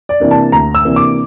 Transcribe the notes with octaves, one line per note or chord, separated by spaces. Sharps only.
D5
C3 E3 A#3 D4
A5
D2 A#5
E6
C3 E3 A#3 D4
D6